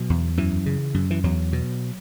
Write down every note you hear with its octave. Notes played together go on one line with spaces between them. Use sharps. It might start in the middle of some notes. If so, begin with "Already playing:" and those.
Already playing: B2 F#3
E2
F#2 E3
C#3
F#2
E3
E2 F#3
B2